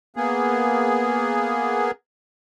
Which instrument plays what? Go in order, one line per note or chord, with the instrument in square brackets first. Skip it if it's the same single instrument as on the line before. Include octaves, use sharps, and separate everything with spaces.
[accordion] A#3 B3 G#4